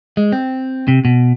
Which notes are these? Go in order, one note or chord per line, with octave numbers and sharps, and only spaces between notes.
G#3
C4
C3
B2